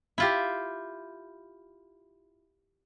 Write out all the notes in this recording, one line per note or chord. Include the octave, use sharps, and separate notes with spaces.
E4 F4 G4